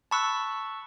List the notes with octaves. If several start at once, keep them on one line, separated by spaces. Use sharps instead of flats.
A5 B5 C#6 E6 F#6